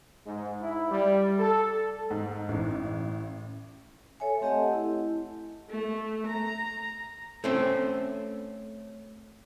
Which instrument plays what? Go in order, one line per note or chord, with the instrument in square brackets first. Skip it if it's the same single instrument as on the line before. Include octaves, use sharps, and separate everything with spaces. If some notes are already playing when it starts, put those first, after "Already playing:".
[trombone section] G#2
E4
G3
A4
[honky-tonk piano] G#2
A1
[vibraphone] A4 C#5 E5 G#5
A3 C4 G4 D#5 F#5 A5
E4
[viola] A3
A#5
[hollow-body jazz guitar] A3 C4 C#4